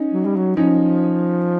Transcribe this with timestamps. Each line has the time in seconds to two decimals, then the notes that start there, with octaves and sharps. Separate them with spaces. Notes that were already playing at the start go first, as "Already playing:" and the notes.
Already playing: C#4 D#4
0.13 F#3
0.25 G3
0.37 F#3
0.57 F3 C#4 D#4